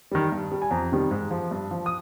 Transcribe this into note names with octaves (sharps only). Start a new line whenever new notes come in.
D#3 G3
G2
G3
G#5
F2 A#5
C3 D#3 G3
G#2
F3
G2
F3
D#6